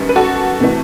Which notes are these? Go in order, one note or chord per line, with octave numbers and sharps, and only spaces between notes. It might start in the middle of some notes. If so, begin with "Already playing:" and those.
Already playing: F#2 D#3 G3 B3
B4
F#4 A4
C3 E3 A3